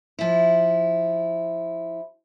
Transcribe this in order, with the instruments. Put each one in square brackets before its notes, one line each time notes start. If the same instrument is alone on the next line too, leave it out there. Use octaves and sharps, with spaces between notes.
[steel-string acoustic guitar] F3 E4